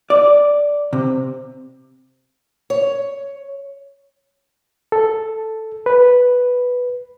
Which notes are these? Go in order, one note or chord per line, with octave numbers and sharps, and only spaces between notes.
D5
C3
C#5
A4
B4